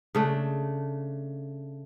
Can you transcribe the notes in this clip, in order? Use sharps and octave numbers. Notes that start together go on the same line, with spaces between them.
C#3 A3 D4